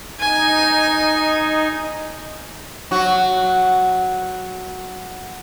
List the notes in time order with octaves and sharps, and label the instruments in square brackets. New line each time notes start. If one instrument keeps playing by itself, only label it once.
[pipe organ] D#4 [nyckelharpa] G#5
[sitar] F#3 F#4